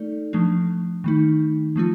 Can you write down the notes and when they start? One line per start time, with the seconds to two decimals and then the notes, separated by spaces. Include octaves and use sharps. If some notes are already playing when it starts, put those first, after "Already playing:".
Already playing: A3 D#4 A4 D5
0.33 F3 A3 D4
1.04 D#3 A3 D#4
1.76 F3 A3 C4 F4